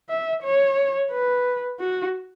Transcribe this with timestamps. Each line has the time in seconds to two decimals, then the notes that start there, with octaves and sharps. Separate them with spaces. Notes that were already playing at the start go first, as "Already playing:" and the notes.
0.10 E5
0.44 C#5
1.12 B4
1.80 F#4